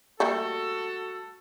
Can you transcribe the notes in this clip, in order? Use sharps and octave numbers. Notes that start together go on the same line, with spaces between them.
G3 A3 A#3 F#4 A4